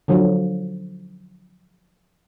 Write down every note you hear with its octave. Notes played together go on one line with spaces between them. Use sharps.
D3 F3 F#3